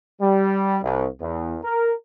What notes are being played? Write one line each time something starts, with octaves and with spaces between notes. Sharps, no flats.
G3
C2
E2
A#4